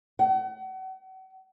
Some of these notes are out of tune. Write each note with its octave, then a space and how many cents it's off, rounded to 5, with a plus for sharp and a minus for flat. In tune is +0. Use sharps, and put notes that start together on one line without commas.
F#5 +40